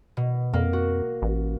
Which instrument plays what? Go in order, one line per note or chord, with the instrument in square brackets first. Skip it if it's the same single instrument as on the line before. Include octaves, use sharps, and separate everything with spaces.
[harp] B2
[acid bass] F2 [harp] A#3
[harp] F#4
[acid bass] A1